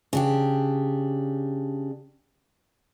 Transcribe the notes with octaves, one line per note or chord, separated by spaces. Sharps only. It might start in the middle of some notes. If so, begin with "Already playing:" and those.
C#3 D4 G4